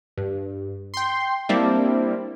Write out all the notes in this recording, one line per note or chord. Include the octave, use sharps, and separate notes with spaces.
G2
G5 C6
G3 A#3 C4 D4 E4